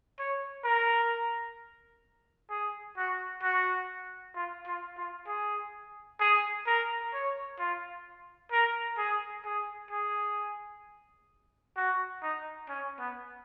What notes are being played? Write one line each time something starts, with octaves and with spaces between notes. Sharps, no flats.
C#5
A#4
G#4
F#4
F#4
F4
F4
F4
G#4
G#4
A#4
C#5
F4
A#4
G#4
G#4
G#4
F#4
D#4
C#4
B3